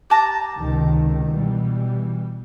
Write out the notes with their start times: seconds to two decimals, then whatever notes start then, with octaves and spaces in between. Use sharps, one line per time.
0.10 G4 A5 A#5
0.56 C#2 C3 D#3
1.32 B2 E3 G3